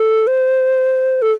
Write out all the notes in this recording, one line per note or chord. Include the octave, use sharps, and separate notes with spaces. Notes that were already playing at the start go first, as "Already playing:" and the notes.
Already playing: A4
C5
A4